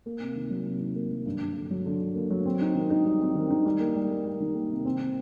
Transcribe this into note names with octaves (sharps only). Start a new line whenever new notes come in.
A#3
C3
D#3
F#3
C3
D#3
A#3
F#3
G2
G2
D3
F#3
D3
D3
A#3
F#3
C4
D#4
D#3
D#4
G3
C4
D#3
D#4
G3
A#3
G3
A#3
G3
D#3
A#3
C3
C4
C4